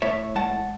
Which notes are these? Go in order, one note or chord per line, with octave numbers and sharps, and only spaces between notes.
A2 C#5 E5
G#3 F#5 A5